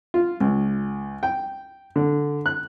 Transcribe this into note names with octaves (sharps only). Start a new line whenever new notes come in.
F4
C#2
G5
D3
F#6